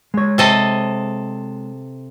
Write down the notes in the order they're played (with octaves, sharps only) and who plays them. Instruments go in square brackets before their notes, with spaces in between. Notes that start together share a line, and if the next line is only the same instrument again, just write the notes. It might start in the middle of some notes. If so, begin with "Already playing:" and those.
[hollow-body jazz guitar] G#3 C#5
[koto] C3 A4 D#5